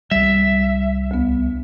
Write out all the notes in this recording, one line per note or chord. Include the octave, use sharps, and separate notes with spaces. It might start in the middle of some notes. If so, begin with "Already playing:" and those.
C2 G3 E5
D2 B3